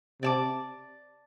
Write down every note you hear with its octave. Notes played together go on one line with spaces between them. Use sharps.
C3 D5 A5 D6